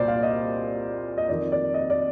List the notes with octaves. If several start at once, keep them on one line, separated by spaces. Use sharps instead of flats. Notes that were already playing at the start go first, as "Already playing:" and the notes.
Already playing: C2 A#2 C5 D5
F5
D#5
D#5
F2 D#3 D5
D5
D#5
D5